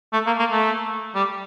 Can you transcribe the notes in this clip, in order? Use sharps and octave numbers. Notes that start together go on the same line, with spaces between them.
A3
A#3
A#3
A3
G3